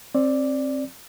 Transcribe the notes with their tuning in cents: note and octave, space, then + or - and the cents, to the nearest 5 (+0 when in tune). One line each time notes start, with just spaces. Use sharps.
C4 +25 D5 +0